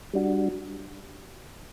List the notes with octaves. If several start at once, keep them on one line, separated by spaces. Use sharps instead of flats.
G3 D4 F#4